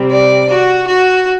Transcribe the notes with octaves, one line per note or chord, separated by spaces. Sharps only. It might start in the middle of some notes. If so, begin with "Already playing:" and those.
Already playing: C3 G3 C4
D5
F#4
F#4